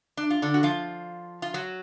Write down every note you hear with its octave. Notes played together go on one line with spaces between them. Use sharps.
D4
F4
D3 D4
F#4
F3 F4
F4
F#3 F#4